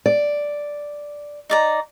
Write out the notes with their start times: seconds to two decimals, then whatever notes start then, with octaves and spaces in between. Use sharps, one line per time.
0.06 D5
1.50 D#4 D5 A#5